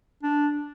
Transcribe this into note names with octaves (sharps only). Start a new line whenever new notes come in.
D4